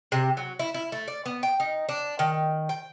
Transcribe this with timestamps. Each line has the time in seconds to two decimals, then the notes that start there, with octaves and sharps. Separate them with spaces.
0.12 C3
0.37 F#3
0.59 E4
0.74 E4
0.92 A3
1.08 D5
1.26 B3
1.43 G5
1.60 D#4
1.89 D4
2.19 D#3
2.69 G5